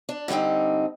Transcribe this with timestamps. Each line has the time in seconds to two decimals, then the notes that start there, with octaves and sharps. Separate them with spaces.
0.09 D4
0.28 D3 G3 A3 C4 D#4